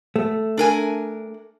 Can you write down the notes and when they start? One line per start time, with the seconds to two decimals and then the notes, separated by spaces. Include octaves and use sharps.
0.16 A3
0.57 D4 A#4 G#5